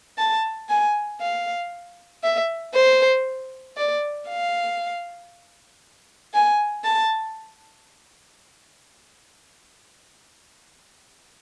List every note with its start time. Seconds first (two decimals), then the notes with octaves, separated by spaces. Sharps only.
0.18 A5
0.69 G#5
1.21 F5
2.24 E5
2.75 C5
3.77 D5
4.29 F5
6.34 G#5
6.84 A5